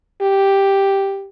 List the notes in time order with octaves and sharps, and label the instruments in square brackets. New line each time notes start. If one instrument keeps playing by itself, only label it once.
[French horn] G4